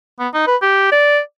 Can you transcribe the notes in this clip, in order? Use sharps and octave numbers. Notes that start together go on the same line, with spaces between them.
B3
D#4
B4
G4
D5